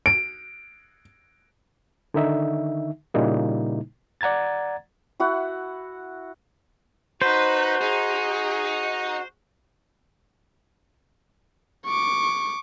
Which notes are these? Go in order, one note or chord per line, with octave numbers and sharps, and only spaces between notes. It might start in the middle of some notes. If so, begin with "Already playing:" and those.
D7
D3 D#3 D#4 E5
A#2 C#3 G3 A#3 D#4 E4
D5 F#5 A#5 G#6 A6
E4 F#4 F#5
D#4 F#4 B4 C5
D#4 G#4
C#6 D6